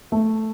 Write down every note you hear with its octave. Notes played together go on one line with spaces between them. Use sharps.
A3